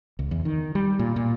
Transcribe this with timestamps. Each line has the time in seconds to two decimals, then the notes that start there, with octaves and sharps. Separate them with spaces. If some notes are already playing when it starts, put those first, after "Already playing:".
0.19 C#2
0.31 E2
0.45 D#3
0.75 G3
0.99 A#2
1.16 A#2